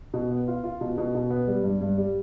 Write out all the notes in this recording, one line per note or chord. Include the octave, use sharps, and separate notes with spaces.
B2
B3
F4
F4
B2
B2
B2
B3
G3
G2
G2
G3